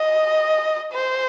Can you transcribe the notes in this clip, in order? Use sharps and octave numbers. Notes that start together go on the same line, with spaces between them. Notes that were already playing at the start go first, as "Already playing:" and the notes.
Already playing: D#5
C5